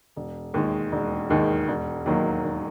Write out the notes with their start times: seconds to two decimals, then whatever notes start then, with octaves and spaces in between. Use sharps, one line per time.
0.16 E1
0.54 D#2 D#3 G#3
0.92 E1
1.30 D#2 D#3 G#3
1.68 E1
2.06 D#2 D#3 F#3 A#3
2.44 E1